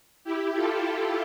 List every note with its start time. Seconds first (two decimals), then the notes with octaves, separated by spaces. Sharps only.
0.24 E4 G4
0.54 F4 A4